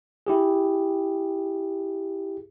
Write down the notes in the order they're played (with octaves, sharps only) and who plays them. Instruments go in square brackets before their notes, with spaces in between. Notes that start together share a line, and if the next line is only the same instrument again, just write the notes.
[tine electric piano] E4 G4 G#4